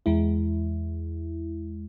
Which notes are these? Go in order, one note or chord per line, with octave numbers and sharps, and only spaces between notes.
E2 G#3 E4